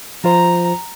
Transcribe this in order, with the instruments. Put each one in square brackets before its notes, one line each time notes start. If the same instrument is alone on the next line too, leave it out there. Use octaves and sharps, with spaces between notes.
[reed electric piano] F3 F4 C5 [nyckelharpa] A#5